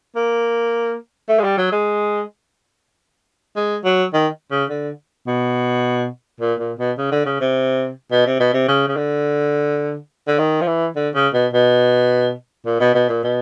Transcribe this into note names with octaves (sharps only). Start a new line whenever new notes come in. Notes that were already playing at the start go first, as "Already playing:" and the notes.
A#3
A3
G#3
G3
F#3
G#3
G#3
F#3
D#3
C#3
D3
B2
A#2
A#2
B2
C#3
D3
C#3
C3
B2
C3
B2
C3
C#3
C#3
D3
D3
D#3
F3
E3
D3
C#3
B2
B2
A#2
B2
B2
A#2
B2